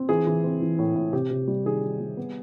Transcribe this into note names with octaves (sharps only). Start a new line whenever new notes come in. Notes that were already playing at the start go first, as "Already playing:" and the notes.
Already playing: C4
E3 G#4
E3
C4
E3
A2
A2
C3 G4
C3
G3
D#3 G#4
D#3
G3
B3